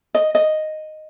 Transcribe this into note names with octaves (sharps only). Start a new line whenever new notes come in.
D#5
D#5